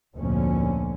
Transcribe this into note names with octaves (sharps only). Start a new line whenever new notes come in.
F1 D2 A#2 D3 C#4